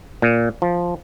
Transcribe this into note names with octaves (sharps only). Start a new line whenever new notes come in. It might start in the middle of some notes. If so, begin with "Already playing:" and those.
A#2
F3